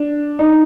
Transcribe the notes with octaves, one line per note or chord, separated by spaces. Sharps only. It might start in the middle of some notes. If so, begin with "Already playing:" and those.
Already playing: D4
D#4